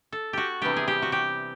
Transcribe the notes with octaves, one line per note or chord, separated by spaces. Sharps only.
A4
F#4 G4
C3 E3 G3 B3 D4 G4
G#4
G4
F#4
G4